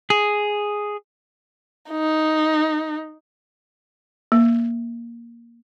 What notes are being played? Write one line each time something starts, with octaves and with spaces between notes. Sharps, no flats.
G#4
D#4
A#3